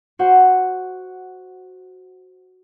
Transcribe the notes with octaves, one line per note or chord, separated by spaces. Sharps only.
F#4 C5 F#5